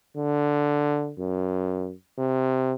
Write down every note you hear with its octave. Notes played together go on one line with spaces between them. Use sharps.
D3
F#2
C3